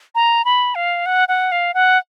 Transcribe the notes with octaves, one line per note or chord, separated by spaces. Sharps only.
A#5
B5
F5
F#5
F#5
F5
F#5